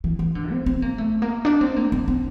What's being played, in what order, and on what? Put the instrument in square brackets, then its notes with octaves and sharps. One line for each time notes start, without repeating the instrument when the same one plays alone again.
[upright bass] E3
E3
D3
C4
C4
A#3
A3
A#3
D4
C4
A#3
C4
C4